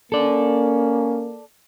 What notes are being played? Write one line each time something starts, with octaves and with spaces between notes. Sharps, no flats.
A#3 C#4 A4 D5